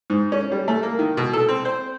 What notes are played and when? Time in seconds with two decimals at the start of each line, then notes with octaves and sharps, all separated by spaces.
0.10 G#2
0.32 C#4
0.52 G3
0.68 A3
0.83 A#3
0.99 D#3
1.17 B2
1.33 A4
1.49 C4
1.65 C5